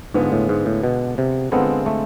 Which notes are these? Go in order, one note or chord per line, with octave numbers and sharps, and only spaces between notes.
G#2 D3 G#3 B3 F4
A2
G#2
A2
B2
C3
D3 G#3 B3 C4 F4 A4
A3